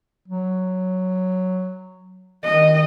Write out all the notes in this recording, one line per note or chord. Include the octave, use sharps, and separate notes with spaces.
F#3
D#3 D#5